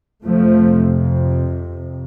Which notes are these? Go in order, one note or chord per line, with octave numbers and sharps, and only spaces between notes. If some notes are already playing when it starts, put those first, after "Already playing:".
F2 C3 F3 A3